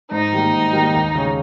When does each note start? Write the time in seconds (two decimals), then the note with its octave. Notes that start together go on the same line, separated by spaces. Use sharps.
0.11 G#2 D#4
0.33 D#3 G3 A#3
0.53 G#2
0.73 D#3 G3 A#3
0.94 D#2
1.15 C#3 G#3 C#4